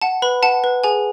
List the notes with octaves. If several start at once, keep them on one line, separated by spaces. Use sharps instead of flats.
F#5 A5
B4 B5
F#5 A5
B4
G#4 G#5